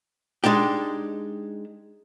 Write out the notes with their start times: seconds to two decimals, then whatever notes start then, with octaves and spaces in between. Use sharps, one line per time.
0.44 G#3 D4 D#4 G4